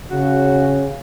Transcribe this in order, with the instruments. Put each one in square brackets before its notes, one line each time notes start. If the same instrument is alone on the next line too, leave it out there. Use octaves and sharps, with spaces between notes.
[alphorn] C#3 [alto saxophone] F#4